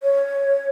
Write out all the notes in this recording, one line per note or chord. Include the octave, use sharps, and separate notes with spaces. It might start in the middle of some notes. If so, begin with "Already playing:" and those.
C#5